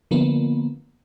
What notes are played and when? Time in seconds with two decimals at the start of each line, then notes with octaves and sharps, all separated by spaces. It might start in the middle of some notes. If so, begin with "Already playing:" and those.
0.11 D3 F3 A#3 B3